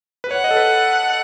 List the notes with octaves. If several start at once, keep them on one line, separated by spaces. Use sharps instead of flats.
B4
C#5 F#5
D#5
A4
B4